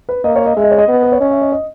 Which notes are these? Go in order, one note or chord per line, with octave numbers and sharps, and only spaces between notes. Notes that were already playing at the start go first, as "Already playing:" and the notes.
B4
A#3 D#5
C#5
D#5
G#3 E5
D#5
C#5
D#5
B3
B4
C#5
C#4 D#5
E5
D#5
D#5